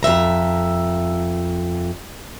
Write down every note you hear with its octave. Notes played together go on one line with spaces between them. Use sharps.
F2 G#3 E5 A#5